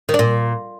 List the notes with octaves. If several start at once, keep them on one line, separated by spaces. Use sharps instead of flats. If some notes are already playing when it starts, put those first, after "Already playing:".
D#3
D4
A#2